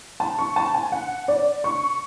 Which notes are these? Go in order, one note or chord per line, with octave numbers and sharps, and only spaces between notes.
A5
C#6
A5
G#5
F#5
D5
C#6